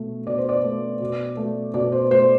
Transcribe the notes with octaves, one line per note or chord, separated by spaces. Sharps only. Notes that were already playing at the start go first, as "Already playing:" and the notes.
Already playing: B2 A3
B2 D5
C5
D5
A3
B2
A3
B2 D5
C5
A3 C5